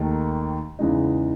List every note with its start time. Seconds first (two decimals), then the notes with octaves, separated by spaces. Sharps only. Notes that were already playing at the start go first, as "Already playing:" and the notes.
Already playing: D#2 D#3 A3
0.79 E2 C#3 E3 G#3 D#4